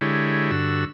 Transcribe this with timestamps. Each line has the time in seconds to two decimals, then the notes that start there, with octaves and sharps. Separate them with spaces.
0.01 D3 G#3 E4 G4 C#5
0.51 G2 D3 F#4 E6